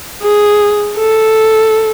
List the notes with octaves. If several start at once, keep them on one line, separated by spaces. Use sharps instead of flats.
G#4
A4